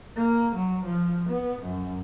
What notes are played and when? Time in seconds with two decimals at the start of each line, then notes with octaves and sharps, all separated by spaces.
0.16 A#3
0.56 F#3
0.85 F3
1.29 B3
1.62 F#2